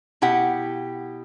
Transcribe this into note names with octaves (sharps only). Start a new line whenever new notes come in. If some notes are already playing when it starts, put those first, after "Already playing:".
B2 E4 G4 F#5